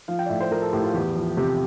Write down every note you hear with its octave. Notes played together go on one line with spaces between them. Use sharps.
F3 F5
G5
D5
A2 E5
C5
F3 A#4
A4
A2 G4
F4
E2 G4
F3
C3 G4